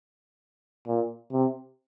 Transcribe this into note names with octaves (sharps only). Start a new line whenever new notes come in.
A#2
C3